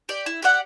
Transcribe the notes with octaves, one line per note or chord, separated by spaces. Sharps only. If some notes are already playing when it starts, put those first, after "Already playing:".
G4 D5
E4
G4 D5 F#5